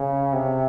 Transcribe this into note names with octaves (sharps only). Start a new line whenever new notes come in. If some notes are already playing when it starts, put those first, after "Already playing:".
Already playing: C#3
C3